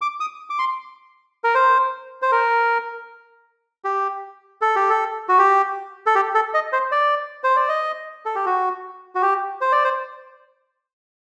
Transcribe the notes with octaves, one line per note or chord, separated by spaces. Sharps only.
D6
D#6
D6
C6
A#4
C5
C5
A#4
G4
A4
G4
A4
F#4
G4
A4
G4
A4
D#5
C5
D5
C5
D5
D#5
A4
G4
F#4
F#4
G4
C5
D5
C5